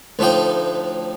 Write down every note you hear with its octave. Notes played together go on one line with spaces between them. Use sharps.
D2 A2 F3 D#4 G5